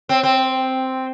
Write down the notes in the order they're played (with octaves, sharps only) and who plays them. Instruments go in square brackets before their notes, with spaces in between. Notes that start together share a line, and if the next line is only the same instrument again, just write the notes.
[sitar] C4
C4